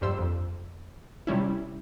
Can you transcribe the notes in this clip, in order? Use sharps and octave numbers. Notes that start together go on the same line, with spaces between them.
A#1 G2 G3 C5 E6
F2
C3 G3 C#4 E4